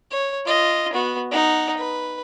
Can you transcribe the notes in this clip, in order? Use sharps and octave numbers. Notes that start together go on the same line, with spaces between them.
C#5
F4 D#5
B3 F#4
D#4 F#5
B4